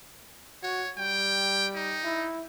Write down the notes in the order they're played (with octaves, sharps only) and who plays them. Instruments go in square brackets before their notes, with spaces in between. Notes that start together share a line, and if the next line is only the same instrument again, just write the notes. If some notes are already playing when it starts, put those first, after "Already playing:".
[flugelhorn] F#4 [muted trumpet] C#5
[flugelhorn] G3 [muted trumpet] G5
[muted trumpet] D#4
[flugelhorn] E4